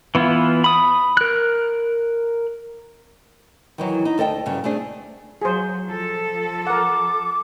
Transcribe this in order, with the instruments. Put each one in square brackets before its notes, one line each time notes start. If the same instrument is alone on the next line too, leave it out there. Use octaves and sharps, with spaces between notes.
[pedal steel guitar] E3 B3 E4 F4
B5 D#6
A#4 F#6
[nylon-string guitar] D#3 E3 F#3
D#4
D2 A4 D#5 G5 A5
G2 C#3 F#3
A3 C4 D4 G#4
[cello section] F#3 [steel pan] G#4 C5
[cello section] F3 A4
[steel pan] A#4 F#5 [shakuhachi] D6